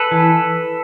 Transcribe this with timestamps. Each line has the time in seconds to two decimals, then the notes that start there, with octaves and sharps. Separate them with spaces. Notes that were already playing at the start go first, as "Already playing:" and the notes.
Already playing: A4 B4
0.11 E3